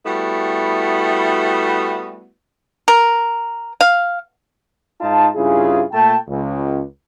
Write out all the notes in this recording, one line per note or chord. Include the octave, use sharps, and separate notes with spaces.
G3 A3 B3 E4 F#4
A#4
F5
G#2 D#4 F4 A5
G2 C#3 E4 F4 G#4
A#2 A3 G5 A5
C#2